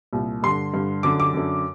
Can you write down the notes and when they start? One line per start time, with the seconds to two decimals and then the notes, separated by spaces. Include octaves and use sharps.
0.13 C2 A#2
0.43 G2 D3 C6
0.74 G2 D3
1.03 F#2 D3 D6
1.20 D6
1.34 F#2 D3